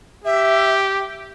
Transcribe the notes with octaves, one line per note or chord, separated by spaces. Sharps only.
G4 E5